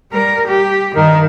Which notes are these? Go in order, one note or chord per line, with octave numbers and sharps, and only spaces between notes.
G3 A#4
G4
G2 D#3 D#4 A#4